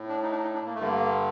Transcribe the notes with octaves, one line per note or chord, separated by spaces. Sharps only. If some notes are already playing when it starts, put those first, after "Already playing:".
Already playing: A2
D4
D#4
D4
D#4
D4
A#3
A3
G2 D3 A#3